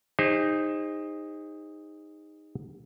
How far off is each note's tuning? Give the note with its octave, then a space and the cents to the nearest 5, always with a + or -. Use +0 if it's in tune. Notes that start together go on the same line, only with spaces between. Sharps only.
D#4 +0 G#4 -40 C5 +20